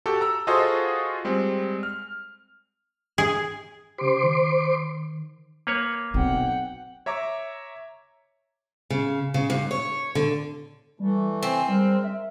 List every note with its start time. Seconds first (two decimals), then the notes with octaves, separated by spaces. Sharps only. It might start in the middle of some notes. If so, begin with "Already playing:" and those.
0.06 F#4 G4 A4
0.21 A#5 E6
0.47 F4 F#4 G#4 A4 C5 D#5
1.25 G3 G#3 C4
1.83 F6
3.18 G#4
3.98 C#3 G4 C5 C6 D6
4.24 D#3
5.67 A#3 B4 C#5
6.14 B1 C4 F#5 G5
7.06 C#5 E5 A#5 D6
8.90 C#3
9.34 C#3
9.50 G2
9.71 C#5
10.15 D3
11.00 E3 G3 A3
11.43 C4 G#5
11.69 G3 G#3 A#4
12.04 E5